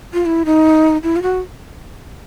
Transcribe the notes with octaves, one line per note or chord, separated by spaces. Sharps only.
F4
E4
D#4
E4
F4
F#4